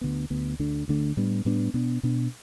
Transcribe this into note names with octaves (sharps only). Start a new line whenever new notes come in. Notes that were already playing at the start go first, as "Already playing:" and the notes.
D2 D3 B3
D2 D3 B3
D2 D3 A3 D4
D2 D3 A3 D4
A2 G3 B3 D4
A2 G3 B3 D4
B2 B3 D4
B2 B3 D4